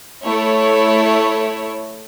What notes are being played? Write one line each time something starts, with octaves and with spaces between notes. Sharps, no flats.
A3 E4 C#5